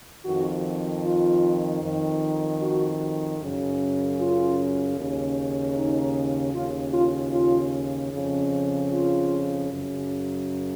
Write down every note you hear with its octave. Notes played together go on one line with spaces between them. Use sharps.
F2 D#3 F#4
F4
F2 D#3
F#4
F#2 C#3
F4
D#2 C#3
D#4
D#2 C#3 F4
F4
F4
F2 C#3
F4
F#2 C#3